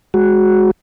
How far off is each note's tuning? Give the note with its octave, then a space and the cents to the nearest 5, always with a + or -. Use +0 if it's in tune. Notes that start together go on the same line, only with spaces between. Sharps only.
G#3 +0 F#4 +0